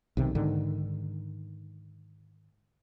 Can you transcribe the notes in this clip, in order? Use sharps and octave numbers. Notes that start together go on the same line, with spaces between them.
B1 C3 D#3
G#2 D3 D#3